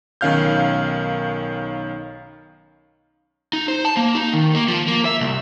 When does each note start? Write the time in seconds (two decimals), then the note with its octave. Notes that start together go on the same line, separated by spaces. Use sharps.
0.21 B1 D#3 C#4 F5 F6 G6
3.53 D#4
3.68 C5
3.85 A5
3.97 A#3
4.15 D#4
4.33 D#3
4.55 A#3
4.68 F3
4.88 A#3
5.05 E5
5.20 C2